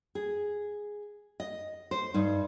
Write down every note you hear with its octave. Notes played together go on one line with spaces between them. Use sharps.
G#4
D#5
C5
G2 D#4